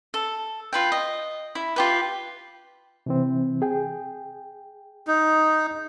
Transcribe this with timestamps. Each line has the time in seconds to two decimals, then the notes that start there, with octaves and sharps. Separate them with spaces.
0.14 A4
0.73 F4 B4 G5
0.92 D#5
1.55 E4
1.76 F4 G4 B4
3.06 C3 E3 C4
3.62 G#4 G5
5.07 D#4